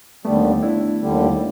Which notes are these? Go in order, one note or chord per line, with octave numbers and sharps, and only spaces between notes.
D#2 D3 G3 A3 B3
D4 E4
D#2 D3 G3